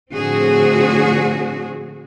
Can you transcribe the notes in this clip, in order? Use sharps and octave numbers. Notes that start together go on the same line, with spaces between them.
A2 D3 F3 C4 F#4 G#4